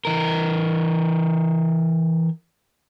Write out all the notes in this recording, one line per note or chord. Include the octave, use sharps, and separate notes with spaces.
E3 A#4